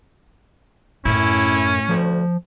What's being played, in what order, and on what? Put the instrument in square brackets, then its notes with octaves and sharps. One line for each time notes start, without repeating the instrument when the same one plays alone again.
[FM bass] F#2 [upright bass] A2 [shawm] C#4 [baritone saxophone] E4
[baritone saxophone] D2 [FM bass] F3